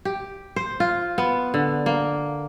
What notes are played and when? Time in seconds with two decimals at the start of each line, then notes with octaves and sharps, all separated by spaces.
0.05 G4
0.56 C5
0.80 F4
1.18 B3
1.54 D3
1.86 A#3